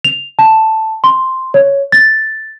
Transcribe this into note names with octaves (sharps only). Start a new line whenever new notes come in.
F7
A5
C6
C#5
A6